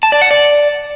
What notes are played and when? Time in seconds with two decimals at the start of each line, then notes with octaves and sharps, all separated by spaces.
0.03 A5
0.12 D5
0.21 F#5
0.31 D5